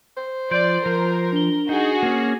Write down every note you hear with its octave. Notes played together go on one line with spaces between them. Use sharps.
C5
F3 D5 C6 G6 D7
F3 A#4
D4 G7
D#4 F#4 G#4
A#3 C#4